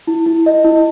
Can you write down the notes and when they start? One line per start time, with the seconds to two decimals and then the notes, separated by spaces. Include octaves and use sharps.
0.07 E4
0.26 E4
0.46 D#5
0.65 E4